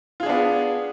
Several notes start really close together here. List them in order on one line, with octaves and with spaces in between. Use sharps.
F4 G#4 D4 B3